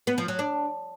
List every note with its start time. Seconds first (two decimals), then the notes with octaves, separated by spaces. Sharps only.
0.07 B3
0.18 F3
0.28 F#3
0.39 D4